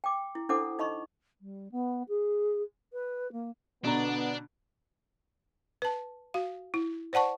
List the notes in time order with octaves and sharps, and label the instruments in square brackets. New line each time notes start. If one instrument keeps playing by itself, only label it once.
[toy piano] G5 D6
E4
D4 E4 A4 C5 F#5 D6
D#4 D#5 B5 C#6
[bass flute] G3
B3
G#4
B4
A#3
[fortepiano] B2 D3 A#5 [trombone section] B3 [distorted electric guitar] D4
[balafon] B4 A5
F#4 F5
E4
C5 D5 F#5 A5 C#6